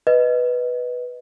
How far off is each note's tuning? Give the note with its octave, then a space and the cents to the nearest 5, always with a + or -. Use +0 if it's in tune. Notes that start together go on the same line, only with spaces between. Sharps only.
B4 +0 D#5 +0